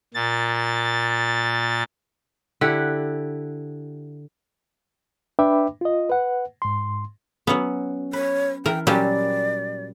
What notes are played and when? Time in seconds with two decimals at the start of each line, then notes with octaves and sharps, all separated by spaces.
0.14 A#2 A6
2.61 D3 E4 G4 F#5
5.39 D4 B4 E5 G5 B5 D6
5.81 F4 D#5
6.09 B4 F#5
6.62 G#2 C6
7.47 F#3 B3 C#4 F#5
8.13 B4 C#5
8.66 E3 A#4 G5
8.87 A#2 F#3 G3 C#4 G4 D5